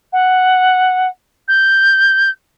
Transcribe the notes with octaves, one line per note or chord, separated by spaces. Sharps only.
F#5
G6